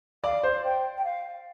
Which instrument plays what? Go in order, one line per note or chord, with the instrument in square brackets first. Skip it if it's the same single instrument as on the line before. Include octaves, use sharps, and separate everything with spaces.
[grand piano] D5 [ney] F5
[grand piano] C5
[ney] G5
G5
F5